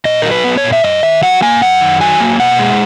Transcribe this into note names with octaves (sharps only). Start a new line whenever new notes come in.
A#2 D#5
F#3 A#4
B4
B3
C#5
A#2
E5
F#2 D#5
D#3 E5
F#3 F#5
A#3 G#5
F#2 F#5
D#3
F#3 G#5
A#3
B2 F#5
G#3